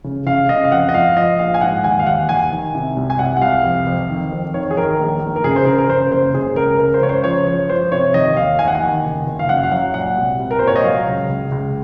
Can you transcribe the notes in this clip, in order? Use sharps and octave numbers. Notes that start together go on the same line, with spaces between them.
C#3
C#3 F5
C#3 D#5
F5
F2 F#5
D#5
F3 F5
F3 D#5
A#1 F5
G#5
G#2 F#5
D#2 G#5
F5
D#2 F#5
D#2 G#5
D#3
C3
C2
G#5
C2 F#5
F#5
C2 F5
F2
F2
D#3
F2
D#3 C#5
G#4
D#3 A#4
A#1
A#1
A#4
C#3 G#4
C5
C#3 A#4
A#4
C#3 C5
F#1 C5
C#3 G#4
C#2 A#4
C#2 A#4
C5
C#3 C#5
C5
F3 C#5
F3 C#5
F3 C5
C3 C#5
D#3 D#5
D#2 F5
D#2 G#5
F#5
G#5
D#3
F#1
F#1
F5
F#2 F#5
F5
F#3 F#5
A#2 F#5
C2
C2
A#4
A#2 C5
C#5
D#5
F#3 F5
C#2
C#2
C#2